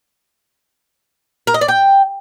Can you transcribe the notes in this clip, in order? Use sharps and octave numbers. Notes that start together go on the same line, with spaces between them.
A#4
D#5
D5
G5